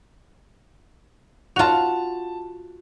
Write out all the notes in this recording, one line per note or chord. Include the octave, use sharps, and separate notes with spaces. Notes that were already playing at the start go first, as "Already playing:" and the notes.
F4 F#4 A5 F7